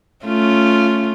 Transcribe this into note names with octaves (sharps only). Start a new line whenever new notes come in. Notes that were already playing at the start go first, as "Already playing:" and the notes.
A3 C#4 F4